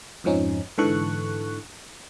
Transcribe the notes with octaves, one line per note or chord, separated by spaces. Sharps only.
F2 G#2 F3 C#4 D#4
G#2 D3 E3 A4 C#6 F#6